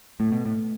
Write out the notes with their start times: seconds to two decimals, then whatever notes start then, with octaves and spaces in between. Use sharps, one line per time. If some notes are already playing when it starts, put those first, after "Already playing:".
0.20 A2 A3
0.32 B2
0.46 A2